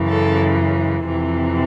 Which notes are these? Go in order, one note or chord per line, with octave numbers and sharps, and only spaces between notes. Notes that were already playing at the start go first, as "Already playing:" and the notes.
Already playing: F#2 C#3 E3
A4
F2 C3 E3